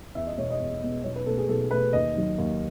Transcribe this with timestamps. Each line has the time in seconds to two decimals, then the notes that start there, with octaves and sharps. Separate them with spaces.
0.15 E2 E5
0.27 D#5
0.37 B2 G#3 B3 C#5
0.50 D#5
0.60 E2
0.82 B2 G#3 B3
1.04 B1 C#5
1.16 B4
1.26 B2 A4
1.30 A3
1.38 G#4
1.49 B1 A4
1.71 B2 A3 B4
1.93 D#2 D#5
2.15 D#3 F#3
2.38 D#2